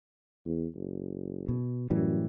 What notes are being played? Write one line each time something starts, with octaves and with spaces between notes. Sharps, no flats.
E2
F#1
B2
F#2 A2 E3 G3